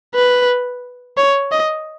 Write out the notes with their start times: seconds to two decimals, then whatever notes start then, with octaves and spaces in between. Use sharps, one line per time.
0.15 B4
1.17 C#5
1.51 D#5